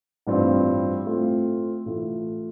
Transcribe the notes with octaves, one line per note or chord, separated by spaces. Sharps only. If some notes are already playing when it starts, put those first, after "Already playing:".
A1 G2 G3 C4 F4
A2 A3 C4 F4
A1 A2 A3 F4